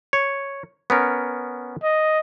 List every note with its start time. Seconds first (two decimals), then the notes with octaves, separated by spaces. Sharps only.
0.13 C#5
0.90 B3 C#4 A#4
1.83 D#5